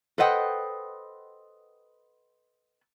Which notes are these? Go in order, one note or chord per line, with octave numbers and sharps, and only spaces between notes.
A4 B4 C5 D#5 F#5 G5